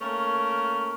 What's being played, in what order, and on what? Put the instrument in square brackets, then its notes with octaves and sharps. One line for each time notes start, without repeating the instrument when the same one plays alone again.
[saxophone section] A3 A#3 C#4 A#4